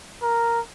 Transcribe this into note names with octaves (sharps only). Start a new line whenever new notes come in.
A#4